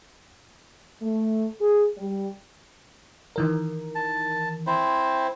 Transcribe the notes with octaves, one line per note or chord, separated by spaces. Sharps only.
A3
G#4
G3
D#3 E3 A#4
A5
C4 E4 C5